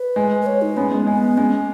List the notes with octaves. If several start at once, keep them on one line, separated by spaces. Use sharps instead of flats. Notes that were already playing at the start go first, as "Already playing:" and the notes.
Already playing: B4
G#3
B4
C#5
D#4
G#3 B3 C#4
G#3
G#3 B3
G#3 C#4